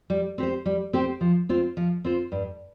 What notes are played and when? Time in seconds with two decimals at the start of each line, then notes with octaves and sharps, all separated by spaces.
0.10 G3
0.38 C4 G4 C5
0.66 G3
0.93 C4 G4 C5
1.21 F3
1.49 C4 F4 C5
1.77 F3
2.04 C4 F4 C5
2.32 G2